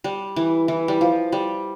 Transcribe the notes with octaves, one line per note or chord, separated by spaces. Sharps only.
G3
E3
E3
G3
F3
G3